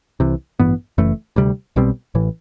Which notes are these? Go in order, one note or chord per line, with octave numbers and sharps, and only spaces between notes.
C2 C3 E3
A1 G2 E3 B3
F#1 F#2 E3 A3
D2 C3 G3
B1 B2 G3 C4
A1 A2 E3